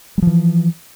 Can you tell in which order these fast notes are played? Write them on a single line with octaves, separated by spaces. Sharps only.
G3 F3 E3